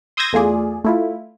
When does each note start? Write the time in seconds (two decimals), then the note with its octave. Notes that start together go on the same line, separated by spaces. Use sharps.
0.17 C6 D#6 E6 G6 G#6 A#6
0.33 E2 A3 F4 G#4 D5
0.85 A3 E4 F4